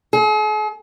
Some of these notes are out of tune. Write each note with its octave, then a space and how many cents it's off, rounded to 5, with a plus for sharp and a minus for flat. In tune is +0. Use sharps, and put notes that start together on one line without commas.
G#4 +45